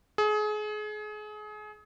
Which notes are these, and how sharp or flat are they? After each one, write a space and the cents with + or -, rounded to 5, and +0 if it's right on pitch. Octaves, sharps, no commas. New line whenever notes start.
G#4 +30